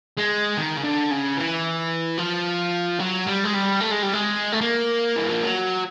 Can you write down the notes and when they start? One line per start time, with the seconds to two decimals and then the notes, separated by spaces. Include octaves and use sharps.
0.17 G#3
0.57 D#3
0.77 C#3
0.84 D3
1.11 C#3
1.37 E3
2.18 F3
2.99 F#3
3.27 G3
3.44 G#3
3.54 G3
3.80 A3
3.91 G#3
4.02 G3
4.13 G#3
4.52 A3
4.61 A#3
5.16 E3
5.29 F3
5.42 F#3